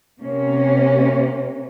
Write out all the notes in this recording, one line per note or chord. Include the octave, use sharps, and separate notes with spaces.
C3 A#3 C#4